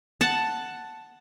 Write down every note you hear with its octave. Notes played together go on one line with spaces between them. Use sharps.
F#5 A5